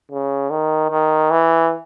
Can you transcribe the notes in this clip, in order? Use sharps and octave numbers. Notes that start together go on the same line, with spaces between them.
C#3
D#3
D#3
E3